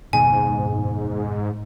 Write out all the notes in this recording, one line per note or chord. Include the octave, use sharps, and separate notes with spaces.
F#1 D#2 G#2 B2 G#5